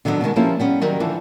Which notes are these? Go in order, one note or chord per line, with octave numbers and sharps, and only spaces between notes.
D3 D#3 F#3 G3 B3 D4
B2 D3 D#3 G#3
F3 A#3 C#4 E4 G4 A4
G3 B3 C#4
D#3 F#3 G3 A#4
D3 E3 F3